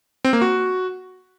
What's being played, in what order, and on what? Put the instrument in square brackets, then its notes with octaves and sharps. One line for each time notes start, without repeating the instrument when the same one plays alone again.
[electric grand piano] C4
A#3
F#4